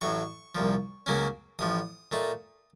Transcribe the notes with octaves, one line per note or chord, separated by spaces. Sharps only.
A1 A2 F#3 C#6
C2 A#2 F3
C#2 C#3 F#3 A#3 C#4
A1 A2 F3 D#6
A#2 A3 D#4